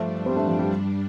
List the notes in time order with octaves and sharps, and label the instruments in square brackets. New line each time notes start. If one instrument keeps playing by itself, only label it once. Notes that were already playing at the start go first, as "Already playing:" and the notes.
Already playing: [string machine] G2 G3 D4 [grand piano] F3 A3
[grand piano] G3 C4
A3 D4
F3
G3